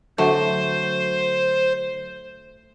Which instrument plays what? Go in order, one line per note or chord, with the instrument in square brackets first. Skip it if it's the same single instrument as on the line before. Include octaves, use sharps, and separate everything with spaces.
[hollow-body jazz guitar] D3 F#3 F#4 [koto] A3 [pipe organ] C5